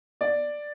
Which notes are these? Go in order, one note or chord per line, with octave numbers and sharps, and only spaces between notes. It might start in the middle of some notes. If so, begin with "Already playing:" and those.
D5